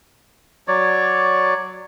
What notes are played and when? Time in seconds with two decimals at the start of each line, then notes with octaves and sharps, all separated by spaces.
0.68 F#3 C#5 D5